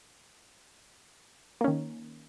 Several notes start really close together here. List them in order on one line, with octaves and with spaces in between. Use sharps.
A#3 C#4 D#3